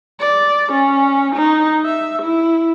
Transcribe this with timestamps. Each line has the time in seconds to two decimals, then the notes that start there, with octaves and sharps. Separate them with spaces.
0.20 D5
0.72 C#4
1.35 D#4
1.85 E5
2.22 E4